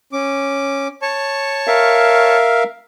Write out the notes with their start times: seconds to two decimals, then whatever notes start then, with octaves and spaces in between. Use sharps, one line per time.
0.13 C#4 D6
1.02 C#5 A5 C#6
1.67 A#4 E5 F5